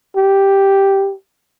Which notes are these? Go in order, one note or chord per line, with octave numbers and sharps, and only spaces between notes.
G4